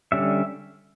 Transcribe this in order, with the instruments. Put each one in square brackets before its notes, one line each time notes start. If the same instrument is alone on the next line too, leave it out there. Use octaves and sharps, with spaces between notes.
[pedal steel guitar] D3 G3 C#4 E5